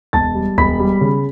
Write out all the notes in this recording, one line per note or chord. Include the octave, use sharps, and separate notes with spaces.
E1 A5 A6
G3
E1 B5 B6
G3
C#3